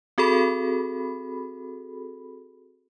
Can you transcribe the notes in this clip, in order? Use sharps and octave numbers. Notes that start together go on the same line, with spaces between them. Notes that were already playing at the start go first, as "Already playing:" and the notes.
C4 F#4 G#4 A4 B5